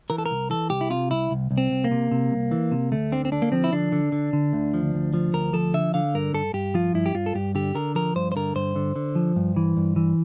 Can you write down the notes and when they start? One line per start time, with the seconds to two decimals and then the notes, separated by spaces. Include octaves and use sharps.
0.10 E3 A#4
0.18 A4
0.26 A#4
0.31 C2
0.50 E3 A4
0.70 C2 G4
0.81 E4
0.90 C3 F4
1.10 C2 E4
1.31 C2
1.51 C2
1.58 C4
1.71 C2
1.84 A#3
1.91 C3
2.11 C3
2.31 C2
2.51 E3
2.72 C3
2.92 D2 A3
3.12 D3 C4
3.25 C4
3.32 D3 D4
3.42 A#3
3.52 F3 C4
3.64 E4
3.72 D3 D4
3.92 D3
4.12 D3
4.33 D3
4.53 D2
4.74 F3
4.94 D2
5.14 F3
5.34 D2 A#4
5.53 F3 A4
5.74 D3 E5
5.94 D3 F5
6.14 G2 A#4
6.34 G2 A4
6.53 G2 G4
6.74 F3 F4
6.94 G2 E4
7.06 G4
7.15 G2 F4
7.26 A4
7.35 G2 G4
7.55 D3 G4
7.75 D3 A#4
7.95 F3 A#4
8.16 G2 C5
8.32 C5
8.36 D3 A#4
8.55 G2 C5
8.76 D3
8.96 D3
9.15 F3
9.36 G2
9.56 E3
9.77 G2
9.96 E3